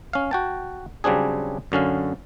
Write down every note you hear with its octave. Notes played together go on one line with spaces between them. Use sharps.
C#4 F5
F#4 G5 A5
C#3 F#3 G3 C4 D4 G#4
F#2 D3 C#4 F5